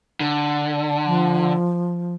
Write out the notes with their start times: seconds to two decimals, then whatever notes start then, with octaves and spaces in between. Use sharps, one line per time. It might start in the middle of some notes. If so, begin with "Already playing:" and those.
0.20 D3
1.06 F3